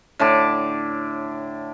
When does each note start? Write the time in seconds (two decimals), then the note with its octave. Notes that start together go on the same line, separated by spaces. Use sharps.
0.19 A2 D3 A5 D6